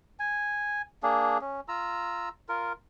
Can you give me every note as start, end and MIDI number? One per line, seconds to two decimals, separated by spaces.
0.19 0.82 80
1.03 1.38 58
1.03 1.38 62
1.03 1.38 68
1.41 1.60 61
1.68 2.29 65
1.68 2.29 82
1.68 2.29 88
2.49 2.73 65
2.49 2.73 70